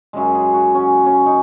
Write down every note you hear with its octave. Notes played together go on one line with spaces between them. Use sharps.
F#2 C#3 G#3 A#4
G#4
F#4
C#4
C#4
D#4